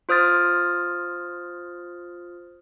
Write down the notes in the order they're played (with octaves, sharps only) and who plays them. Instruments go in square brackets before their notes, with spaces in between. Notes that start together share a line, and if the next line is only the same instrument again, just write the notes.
[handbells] F4 C5 D#6 F6 A6